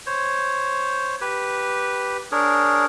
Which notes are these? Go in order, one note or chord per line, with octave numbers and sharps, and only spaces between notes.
C5 C#5
G4 B4
D4 G#4 A#4 C#5